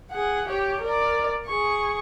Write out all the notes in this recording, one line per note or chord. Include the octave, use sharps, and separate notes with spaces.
G#4 F#5
G4 C#5
A#4 D5
G#4 C#6